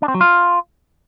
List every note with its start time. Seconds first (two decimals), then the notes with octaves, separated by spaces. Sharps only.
0.02 D4
0.08 C4
0.14 F#3
0.21 F4